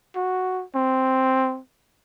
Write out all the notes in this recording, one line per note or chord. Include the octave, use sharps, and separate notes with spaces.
F#4
C4